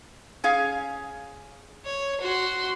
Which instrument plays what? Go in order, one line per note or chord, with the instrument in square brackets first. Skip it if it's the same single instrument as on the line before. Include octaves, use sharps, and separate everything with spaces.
[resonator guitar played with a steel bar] C#4 G#4 F5
[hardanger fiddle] C#5
F#4 C6